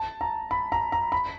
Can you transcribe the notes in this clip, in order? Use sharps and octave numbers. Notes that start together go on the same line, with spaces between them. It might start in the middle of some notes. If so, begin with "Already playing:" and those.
Already playing: A5
A#5
B5
A#5
A#5
B5